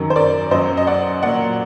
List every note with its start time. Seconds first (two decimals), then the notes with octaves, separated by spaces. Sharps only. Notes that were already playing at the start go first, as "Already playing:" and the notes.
Already playing: F#2 D#3 F#3 A#4
0.10 C5
0.16 A#4 D5
0.51 F#2 F#3 C5 D#5
0.77 D#5
0.87 D5 F#5
1.23 A#2 F#3 D5 F#5